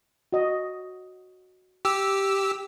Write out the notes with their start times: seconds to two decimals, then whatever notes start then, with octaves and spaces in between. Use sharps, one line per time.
0.32 F#4 D#5
1.85 G4 E6